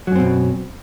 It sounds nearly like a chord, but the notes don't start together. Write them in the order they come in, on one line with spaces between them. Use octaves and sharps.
F#3 F#2 C4 B2